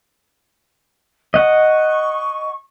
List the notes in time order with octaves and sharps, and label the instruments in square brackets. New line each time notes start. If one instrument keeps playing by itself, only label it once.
[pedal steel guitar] D#5 F#5 [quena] C#6